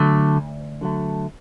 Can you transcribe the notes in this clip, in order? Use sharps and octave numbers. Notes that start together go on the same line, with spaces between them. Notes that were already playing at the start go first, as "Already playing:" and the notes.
Already playing: D3 F#3 A3
D2
D3 F#3 A3